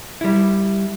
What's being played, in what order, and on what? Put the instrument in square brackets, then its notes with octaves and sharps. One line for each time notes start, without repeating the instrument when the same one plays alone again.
[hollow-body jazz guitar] G3 E4